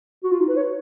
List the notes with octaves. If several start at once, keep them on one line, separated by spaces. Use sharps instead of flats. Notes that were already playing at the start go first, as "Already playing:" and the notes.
F#4
F4
D#4
B4
C#5